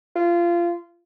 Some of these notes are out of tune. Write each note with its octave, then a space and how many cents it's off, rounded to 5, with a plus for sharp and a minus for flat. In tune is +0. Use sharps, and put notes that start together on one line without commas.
F4 -20